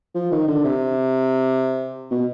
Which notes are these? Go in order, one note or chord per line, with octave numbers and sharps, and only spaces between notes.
F3
D#3
D3
C3
B2